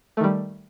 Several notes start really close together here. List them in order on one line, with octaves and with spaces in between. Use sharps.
A3 D#3 G3